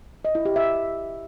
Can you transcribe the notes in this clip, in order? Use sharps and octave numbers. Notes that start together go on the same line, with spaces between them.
D#5
E4
G4
E5